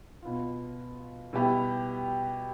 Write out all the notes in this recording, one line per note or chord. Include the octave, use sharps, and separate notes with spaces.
B2 B3 F4
B2 G3 B3 E4 G4